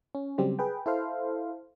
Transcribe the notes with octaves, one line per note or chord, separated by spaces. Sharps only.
C#4
C#3 F#3 G3 C4 G4
G#4 B4 G5
E4 A4 C5 F5